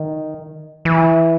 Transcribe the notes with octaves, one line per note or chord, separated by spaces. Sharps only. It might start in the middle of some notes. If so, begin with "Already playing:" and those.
Already playing: D#3
E3